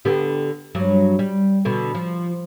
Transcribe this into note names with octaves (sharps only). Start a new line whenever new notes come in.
D3 B3 G4
G2 F#3
G3
B2 D3
F3